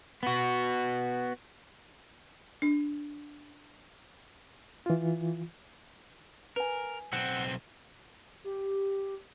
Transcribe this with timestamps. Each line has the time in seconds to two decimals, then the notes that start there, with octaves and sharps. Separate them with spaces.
0.23 B3 F#4
2.62 D4
4.86 E3 F4
6.56 A#4 B4 G#5
7.13 B1 C4 F#5
8.44 G4